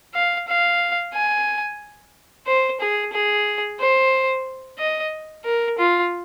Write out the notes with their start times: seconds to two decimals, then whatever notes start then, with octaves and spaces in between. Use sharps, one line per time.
0.14 F5
0.47 F5
1.14 G#5
2.46 C5
2.80 G#4
3.13 G#4
3.79 C5
4.79 D#5
5.45 A#4
5.78 F4